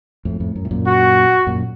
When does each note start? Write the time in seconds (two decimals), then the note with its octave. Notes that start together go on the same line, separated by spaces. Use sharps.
0.25 F2 A2
0.40 F2 A2
0.55 F#2
0.65 A2
0.71 F#2 A#2
0.86 F#4
1.47 F#2 A#2